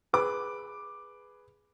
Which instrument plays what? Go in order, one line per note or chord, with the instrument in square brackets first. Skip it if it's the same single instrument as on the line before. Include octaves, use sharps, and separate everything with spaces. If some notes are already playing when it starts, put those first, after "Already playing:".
[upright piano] G#4 B4 D6